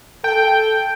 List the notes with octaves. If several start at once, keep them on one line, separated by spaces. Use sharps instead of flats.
A4 G5